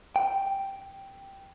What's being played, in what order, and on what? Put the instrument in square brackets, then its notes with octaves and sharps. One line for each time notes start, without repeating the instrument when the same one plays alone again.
[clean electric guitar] G5